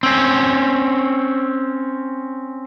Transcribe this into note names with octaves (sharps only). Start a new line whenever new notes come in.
C4 C#4